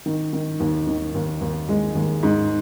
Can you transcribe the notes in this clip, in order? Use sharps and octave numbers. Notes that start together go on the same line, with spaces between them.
D#3
D#3
D#2
D#3
D#2
D#2
G#3
D#2
G#2